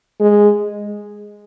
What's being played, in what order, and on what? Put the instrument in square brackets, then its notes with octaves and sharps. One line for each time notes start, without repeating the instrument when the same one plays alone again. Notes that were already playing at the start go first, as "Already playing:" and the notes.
[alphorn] G#3